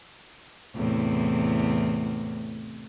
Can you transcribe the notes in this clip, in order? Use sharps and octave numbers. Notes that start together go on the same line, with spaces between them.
E2 A2 C3